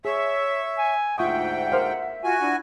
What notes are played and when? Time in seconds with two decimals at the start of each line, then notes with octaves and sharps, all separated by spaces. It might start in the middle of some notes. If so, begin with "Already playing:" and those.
0.05 G#4 C#5 E5
0.78 G#5
1.18 D2 G#2 F4 E5 F#5 G5 C#6 D#6
1.72 A#4 C5 F5
2.24 F4 F#4 G#5
2.41 D4 E4